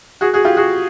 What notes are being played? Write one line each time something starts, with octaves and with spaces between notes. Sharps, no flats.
F#4 G#4
F#4 G#4
F4 G4
F#4 G#4